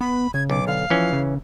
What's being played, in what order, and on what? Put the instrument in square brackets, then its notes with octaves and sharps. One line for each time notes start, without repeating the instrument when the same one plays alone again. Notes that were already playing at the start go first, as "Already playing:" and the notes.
[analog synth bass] B3 [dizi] B5
[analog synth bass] C#3 [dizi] G#6
[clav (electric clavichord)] B1 [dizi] D6
[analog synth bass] D3 [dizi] F5
[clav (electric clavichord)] E3 C#4 [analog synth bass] F3
[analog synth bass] C#3